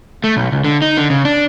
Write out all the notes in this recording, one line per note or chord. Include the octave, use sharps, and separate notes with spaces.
A3
B1
C#2
D3
D#4
D3
C#3
D4